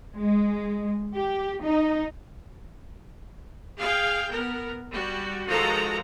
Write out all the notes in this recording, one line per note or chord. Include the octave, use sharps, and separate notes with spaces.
G#3
G4
D#4
G#4 F5 G5
B3 A#4
G3 F#4
D#3 F3 G#3 F#4 A4 A#5